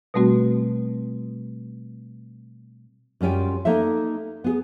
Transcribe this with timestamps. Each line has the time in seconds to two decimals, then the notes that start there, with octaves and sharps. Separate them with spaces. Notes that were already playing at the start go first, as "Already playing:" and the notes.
0.14 B2 G3 A3 C4 F#4
3.21 F#2 G3 C#4 F4 G5
3.65 A#3 D#4 A4 E5
4.44 B3 G#4